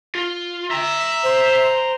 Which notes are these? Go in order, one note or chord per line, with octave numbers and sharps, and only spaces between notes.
F4
E5 G5 A#5
C5